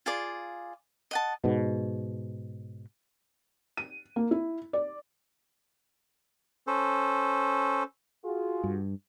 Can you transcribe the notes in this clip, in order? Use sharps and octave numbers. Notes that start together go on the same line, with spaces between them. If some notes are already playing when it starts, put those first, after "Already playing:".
F4 G#4 D5
D#5 F#5 A5
G#2 B2
D#7
A#3
E4
D5
C#4 A4 C5
F4 F#4 G#4
G2